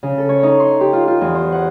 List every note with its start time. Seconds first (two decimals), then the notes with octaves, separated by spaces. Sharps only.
0.03 C#3
0.18 A4
0.29 C#5
0.43 D#4
0.59 C6
0.80 G4
0.93 F4
1.07 F4
1.21 E2
1.35 C5
1.52 F#5